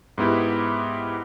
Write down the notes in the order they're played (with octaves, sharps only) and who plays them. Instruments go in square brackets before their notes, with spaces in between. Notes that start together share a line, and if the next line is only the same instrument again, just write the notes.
[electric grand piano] G#2 B3 E4 G4